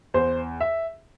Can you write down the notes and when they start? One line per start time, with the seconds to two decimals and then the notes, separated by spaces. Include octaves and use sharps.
0.14 E2 C5
0.60 E5